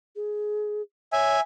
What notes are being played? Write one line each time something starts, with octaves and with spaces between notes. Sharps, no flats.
G#4
C#5 E5 G#5